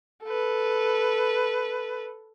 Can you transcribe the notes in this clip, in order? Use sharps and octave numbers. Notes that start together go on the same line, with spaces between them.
A4 B4